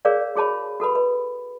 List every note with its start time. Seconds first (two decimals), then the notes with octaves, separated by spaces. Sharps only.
0.05 G#4 A#4 C#5 D5 F5
0.36 F#4 G#4 C#5 A5 B5
0.80 F#4 A4 B4 B5
0.95 B4